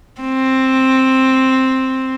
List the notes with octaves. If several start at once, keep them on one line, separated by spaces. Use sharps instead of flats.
C4